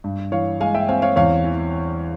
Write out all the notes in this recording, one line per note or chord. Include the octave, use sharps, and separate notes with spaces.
G2
E3 C#5 F5
G#3 F5 G#5
E5 G5
C4 F5 G#5
C#5 F5
E2 C#5 F5
E3